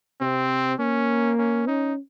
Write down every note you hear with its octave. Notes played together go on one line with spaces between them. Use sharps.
C3 C4
A#3 C#4
C#4
C#4 D#4